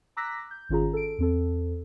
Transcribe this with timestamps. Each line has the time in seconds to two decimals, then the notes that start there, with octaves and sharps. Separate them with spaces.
0.17 A#5 D6 E6 F#6 A#6 B6
0.51 G6
0.69 G#1 D#3 C#4 F4 G#4 A#5
0.93 A4 D7
1.18 E2 C4 A4